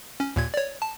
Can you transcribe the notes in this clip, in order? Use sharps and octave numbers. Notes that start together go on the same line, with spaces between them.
C#4
D#2 A#2 G#6
C#5 D5
A5